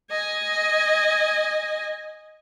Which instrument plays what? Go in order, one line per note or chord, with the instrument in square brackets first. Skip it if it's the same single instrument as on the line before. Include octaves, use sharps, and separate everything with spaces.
[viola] D#5 G#5